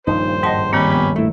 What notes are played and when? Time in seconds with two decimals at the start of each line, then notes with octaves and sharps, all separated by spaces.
0.07 D#1 G2 F3 D#4 C5
0.43 G#2 D#5 F#5 G5 A5
0.73 D#3 G3 A#3 C4 C#4 G4 B5
0.92 C3 B3
1.16 A3 E4